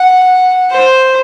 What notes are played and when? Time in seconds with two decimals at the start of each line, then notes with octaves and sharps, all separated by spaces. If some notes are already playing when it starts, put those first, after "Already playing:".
Already playing: F#5
0.71 C5